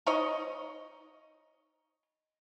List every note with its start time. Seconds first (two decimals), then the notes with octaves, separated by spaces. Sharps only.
0.06 D#4 C#5 D#5